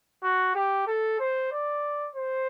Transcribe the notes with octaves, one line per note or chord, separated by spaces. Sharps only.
F#4
G4
A4
C5
D5
C5